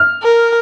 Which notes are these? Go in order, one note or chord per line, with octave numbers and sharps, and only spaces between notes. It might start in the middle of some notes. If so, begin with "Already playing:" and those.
Already playing: F6
A#4